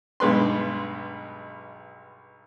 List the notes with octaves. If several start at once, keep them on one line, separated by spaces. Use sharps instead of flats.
B1 G2 G#3 B4 C6